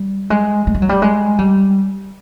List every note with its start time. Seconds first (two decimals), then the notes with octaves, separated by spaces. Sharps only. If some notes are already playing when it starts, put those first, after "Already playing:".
Already playing: G3
0.30 G#3
0.67 G#3
0.74 G3
0.82 F#3
0.89 G3
1.02 G#3
1.39 G3